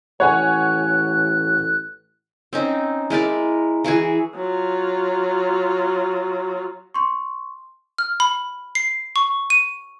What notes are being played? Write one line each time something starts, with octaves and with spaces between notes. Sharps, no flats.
A1 C#5 F#5 G#5 F#6
C4 C#4 D#4
G#3 E4 A#4 D5
E3 E4 F#4 G#4
F#3 F4
C6 C#6
F6
B5
C7
C#6
D#7